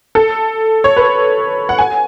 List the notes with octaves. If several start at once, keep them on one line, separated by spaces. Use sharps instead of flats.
A4
C#5
B4
F#5
G#5